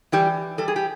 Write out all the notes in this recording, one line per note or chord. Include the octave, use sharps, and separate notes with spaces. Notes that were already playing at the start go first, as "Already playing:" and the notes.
E3 G3 G4
G3 A4
G#4
G4